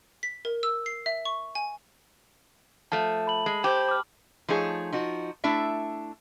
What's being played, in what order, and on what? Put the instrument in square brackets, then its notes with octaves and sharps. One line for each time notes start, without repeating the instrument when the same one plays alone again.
[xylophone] B6
A#4
E6
C7
E5
C#6
G#5
[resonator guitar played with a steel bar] F3 A3 [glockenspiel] A5
[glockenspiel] B5 F#7
[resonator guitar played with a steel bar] G#3
[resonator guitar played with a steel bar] G4 [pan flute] C5
[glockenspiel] D6 F6
[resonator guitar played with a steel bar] F3 A3 D#4 G#4 B4 C#5
F3 D#4 F#4
A3 D4 E4 E5